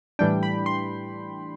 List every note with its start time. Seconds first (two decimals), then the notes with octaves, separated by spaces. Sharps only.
0.19 A2 E3 G3 D4 G5
0.43 B5
0.66 C6